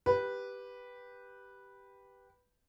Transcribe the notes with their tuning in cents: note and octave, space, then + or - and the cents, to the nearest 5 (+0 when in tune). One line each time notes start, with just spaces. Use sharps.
G4 +0 B4 -5